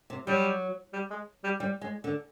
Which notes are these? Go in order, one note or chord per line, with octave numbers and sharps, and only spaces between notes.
C3
F#3 G3
G3
G#3
G3
G3
G#3
D3